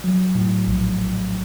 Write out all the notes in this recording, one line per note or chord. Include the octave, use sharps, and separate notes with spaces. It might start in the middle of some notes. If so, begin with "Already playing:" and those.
F#3
A2
A#1